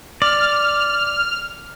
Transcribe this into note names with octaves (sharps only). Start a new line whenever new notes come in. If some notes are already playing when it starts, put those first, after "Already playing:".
D5 F6